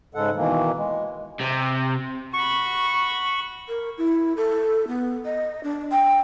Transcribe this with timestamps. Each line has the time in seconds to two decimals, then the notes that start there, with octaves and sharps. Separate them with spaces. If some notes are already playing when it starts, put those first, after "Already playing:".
0.15 G#2 C#3 G#3 A4 F#5
0.36 B2 D#3 E3 A#3
0.77 G#3
1.40 C3
2.34 F#4 B5 C#6
3.67 A#4
3.98 E4
4.37 A4
4.88 B3
5.25 D#5
5.63 D4
5.92 G5